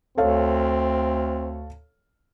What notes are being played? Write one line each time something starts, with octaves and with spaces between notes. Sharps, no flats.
D2 C4 A4 C#5 F5